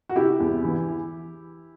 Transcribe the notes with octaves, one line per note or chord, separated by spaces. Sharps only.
F#4
C3 E4 G4
E2
E3